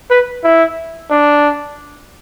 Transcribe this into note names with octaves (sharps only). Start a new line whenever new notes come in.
B4
E4
D4